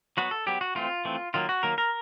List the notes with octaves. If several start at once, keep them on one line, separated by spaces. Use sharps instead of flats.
F#3 B3 F#4
A4
F#3 B3 G4
F#4
E3 A3 C4 F4
E3 A3 C4
D#3 F#3 A#3 F4
F#4
D#3 F#3 A#3 A#4
A#4